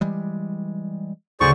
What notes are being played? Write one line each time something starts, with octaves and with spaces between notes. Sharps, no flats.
E3 G3 G#3
D2 C#3 G#4 C5 D5 C#6